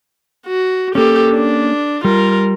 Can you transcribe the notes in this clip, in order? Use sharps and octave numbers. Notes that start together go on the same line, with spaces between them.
F#4
A#3 C#4 G4 A4
D4
G3 F4 A#4